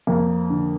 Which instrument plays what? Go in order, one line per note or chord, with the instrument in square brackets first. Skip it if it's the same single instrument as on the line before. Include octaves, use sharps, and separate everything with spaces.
[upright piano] F2 A#3
D3